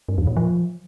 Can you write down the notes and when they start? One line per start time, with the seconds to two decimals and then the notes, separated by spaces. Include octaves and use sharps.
0.09 G2
0.18 E2
0.27 A#2
0.37 F3